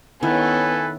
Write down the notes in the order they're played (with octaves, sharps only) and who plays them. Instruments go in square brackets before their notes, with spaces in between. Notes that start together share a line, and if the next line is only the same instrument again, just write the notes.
[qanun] D#3 E4 [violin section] B3 C#4 [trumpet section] A4 B4 G#5